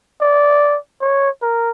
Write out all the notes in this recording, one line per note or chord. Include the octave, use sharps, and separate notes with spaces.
D5
C#5
A#4